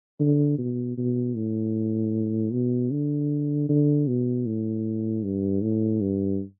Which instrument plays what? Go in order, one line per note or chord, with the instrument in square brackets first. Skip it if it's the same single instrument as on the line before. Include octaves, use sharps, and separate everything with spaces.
[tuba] D3
B2
B2
A2
B2
D3
D3
B2
A2
G2
A2
G2